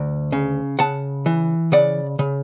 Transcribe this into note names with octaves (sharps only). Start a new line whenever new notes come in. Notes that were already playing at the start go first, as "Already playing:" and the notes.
Already playing: D2
C#3
C#3 F#5 A5
E3
C#3 D5 F#5
C#3